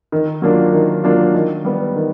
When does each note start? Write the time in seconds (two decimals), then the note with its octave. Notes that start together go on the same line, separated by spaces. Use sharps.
0.12 D#3
0.42 F#3 A#3 D4 F4
0.73 D#3
1.04 F#3 A#3 D4 F4
1.35 D#3
1.65 G3 B3
1.96 D#3